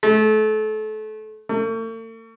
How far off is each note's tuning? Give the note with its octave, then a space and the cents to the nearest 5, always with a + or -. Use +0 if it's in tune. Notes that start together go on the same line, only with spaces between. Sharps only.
A3 -30
A3 +45